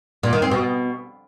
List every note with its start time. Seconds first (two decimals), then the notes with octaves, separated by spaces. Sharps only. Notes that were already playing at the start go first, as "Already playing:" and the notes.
0.23 A#2
0.33 D#3
0.42 C4
0.51 B2